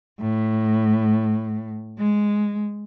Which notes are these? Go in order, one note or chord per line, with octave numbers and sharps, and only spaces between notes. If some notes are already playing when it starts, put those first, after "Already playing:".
A2
G#3